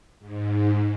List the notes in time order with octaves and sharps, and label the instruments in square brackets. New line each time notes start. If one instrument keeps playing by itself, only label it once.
[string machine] G#2